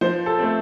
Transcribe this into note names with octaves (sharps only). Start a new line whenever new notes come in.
F3 C5
A4
A3 C4